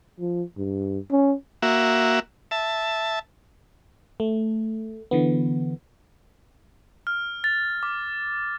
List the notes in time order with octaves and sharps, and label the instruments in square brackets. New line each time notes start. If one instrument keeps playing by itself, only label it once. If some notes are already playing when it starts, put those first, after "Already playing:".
[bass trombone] F3
G2
C#4
[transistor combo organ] A#3 F#4 E5
E5 A5
[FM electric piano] A3
D3 E3 B3
[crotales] F6
A6
D6